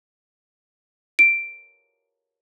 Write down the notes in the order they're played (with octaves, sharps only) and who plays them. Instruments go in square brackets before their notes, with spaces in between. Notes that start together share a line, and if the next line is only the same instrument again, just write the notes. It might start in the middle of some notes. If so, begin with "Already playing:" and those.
[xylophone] D7